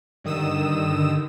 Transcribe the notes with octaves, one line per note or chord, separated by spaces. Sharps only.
G2 D3 D#3 D#6 E6 E7